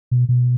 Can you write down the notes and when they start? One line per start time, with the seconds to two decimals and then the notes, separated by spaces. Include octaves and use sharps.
0.11 B2
0.29 B2